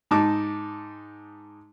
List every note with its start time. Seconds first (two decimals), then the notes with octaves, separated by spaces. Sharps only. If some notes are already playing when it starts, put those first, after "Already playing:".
0.11 G#2 D#4 A5 D6